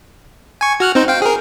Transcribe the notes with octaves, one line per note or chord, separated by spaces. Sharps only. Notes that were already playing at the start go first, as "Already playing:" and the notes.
G#5 C#6
F#4 F6 F#6
C4 D#4 C5
F5 G5
G#4 A#4